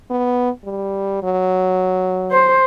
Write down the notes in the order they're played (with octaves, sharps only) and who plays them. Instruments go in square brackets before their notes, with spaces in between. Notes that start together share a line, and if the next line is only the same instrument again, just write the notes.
[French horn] B3
G3
F#3
[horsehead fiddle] C5